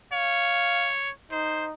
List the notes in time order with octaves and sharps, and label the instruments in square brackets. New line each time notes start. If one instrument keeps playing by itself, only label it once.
[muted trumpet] C#5 [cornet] F5
[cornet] D#4 [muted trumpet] C5